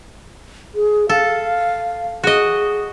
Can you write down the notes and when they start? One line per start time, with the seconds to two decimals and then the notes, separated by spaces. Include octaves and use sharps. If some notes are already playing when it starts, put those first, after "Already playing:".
0.75 G#4
1.09 A4 F5
2.24 F#4 G#4 D#5